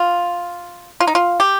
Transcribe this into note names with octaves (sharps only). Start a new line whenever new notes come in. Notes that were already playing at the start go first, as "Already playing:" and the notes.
Already playing: F4
F4
D#4
F4
G4